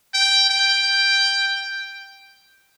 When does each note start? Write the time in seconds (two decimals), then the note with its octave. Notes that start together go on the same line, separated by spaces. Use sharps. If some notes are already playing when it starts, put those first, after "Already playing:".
0.14 G5
0.50 G5